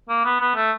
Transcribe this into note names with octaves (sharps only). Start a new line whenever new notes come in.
A#3
B3
B3
A3